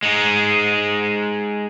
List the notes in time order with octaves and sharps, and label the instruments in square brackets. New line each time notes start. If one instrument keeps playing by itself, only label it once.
[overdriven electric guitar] G#3 D#4